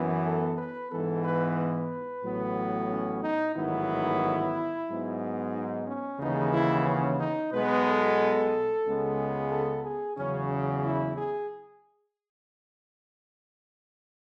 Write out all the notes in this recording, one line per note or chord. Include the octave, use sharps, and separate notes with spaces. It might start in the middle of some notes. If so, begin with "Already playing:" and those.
Already playing: F#2 E3 B3
A4
B4
G#2 E3 B3 A4
B4
B4
A1 A2 F#3 B3
C#4
D#4
A1 G#2 D#3 F#3 B3 E4
G#2 F#3 B3
D#4
C#4
D#2 C#3 E3 G#3 B3 D#4
E4
C#4
D#4
B1 B2 G#3 B3 B4
A4
C#2 C#3 G#3 B3
A4
G#4
E2 C#3 F#3 C#4
E4
G#4